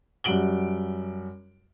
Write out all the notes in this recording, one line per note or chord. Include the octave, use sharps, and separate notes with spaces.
F#2 G3 F#4 D7 F#7 G7